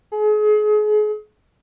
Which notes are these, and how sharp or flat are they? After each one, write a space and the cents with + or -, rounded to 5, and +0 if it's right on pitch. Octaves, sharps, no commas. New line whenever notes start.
G#4 +35